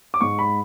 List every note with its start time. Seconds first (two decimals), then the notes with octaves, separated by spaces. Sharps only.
0.14 D6
0.21 G#2 G#3 C#6
0.39 B5